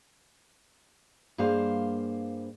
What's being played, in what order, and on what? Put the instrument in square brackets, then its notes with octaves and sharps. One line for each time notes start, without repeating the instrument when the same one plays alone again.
[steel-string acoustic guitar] G2 A#3 G#4 C5 F5